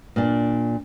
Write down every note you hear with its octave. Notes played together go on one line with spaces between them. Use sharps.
A#2 D4